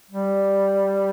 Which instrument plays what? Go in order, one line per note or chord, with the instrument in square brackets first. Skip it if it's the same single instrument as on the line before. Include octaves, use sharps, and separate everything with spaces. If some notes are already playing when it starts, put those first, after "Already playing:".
[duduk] G3